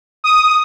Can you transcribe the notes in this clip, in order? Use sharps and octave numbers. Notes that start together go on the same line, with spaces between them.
D#6